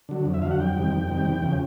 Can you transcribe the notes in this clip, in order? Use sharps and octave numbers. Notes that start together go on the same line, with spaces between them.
D3 F#3
F2
E5
D3 F#3 F5
F#5
F2 G5
C3 D#3 G3
F2
C3 D#3 G3
E2
C#3 F3